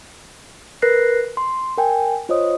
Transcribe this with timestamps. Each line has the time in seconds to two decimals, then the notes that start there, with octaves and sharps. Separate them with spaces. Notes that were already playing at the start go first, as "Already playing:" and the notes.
0.82 A#4 B4 F#6 A#6 C7
1.37 C6
1.77 A#4 G5 G#5
2.29 F4 C5 C#5 D#5 D#6